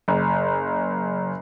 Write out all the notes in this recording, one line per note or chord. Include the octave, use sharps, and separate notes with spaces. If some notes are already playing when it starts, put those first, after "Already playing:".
F#1